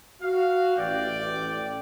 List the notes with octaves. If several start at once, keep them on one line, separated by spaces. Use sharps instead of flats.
F#4 F5
A1 D5 G5